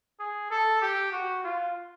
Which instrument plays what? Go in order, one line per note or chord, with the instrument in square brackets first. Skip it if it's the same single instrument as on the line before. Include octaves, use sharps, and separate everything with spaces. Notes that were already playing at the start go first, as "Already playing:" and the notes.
[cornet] G#4
A4
G4
F#4
F4